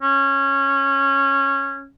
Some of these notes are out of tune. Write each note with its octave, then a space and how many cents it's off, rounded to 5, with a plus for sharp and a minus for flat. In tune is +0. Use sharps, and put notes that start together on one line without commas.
C#4 -15